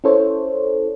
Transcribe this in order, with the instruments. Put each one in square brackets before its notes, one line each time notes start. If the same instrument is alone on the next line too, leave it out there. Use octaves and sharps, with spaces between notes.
[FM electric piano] C#4 E4 A4 C5 C#5